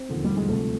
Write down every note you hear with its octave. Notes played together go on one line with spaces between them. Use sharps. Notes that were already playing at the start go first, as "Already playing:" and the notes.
Already playing: C4
E1 D#2 D3 F3
G3
G#3
D2 C3 F3 A3